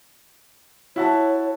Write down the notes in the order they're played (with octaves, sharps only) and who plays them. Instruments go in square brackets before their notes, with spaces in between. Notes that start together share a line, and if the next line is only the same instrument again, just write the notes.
[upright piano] E4 F#4 A5 [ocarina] C#5